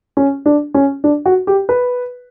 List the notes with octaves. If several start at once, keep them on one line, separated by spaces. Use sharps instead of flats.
C#4
D4
C#4
D4
F#4
G4
B4